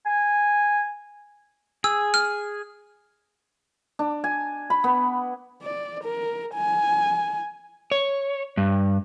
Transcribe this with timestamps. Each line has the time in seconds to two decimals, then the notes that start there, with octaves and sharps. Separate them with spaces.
0.06 G#5
1.84 G#4 E6
2.14 F6
3.99 D4
4.24 G#5
4.70 B5
4.84 B3
5.63 D5
6.04 A#4
6.55 G#5
7.92 C#5
8.57 G2